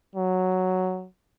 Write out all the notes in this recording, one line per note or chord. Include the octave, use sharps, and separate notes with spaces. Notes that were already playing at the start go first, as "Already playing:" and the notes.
F#3